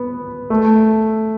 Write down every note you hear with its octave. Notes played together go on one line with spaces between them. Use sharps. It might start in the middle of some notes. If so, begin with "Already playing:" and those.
Already playing: B3
A3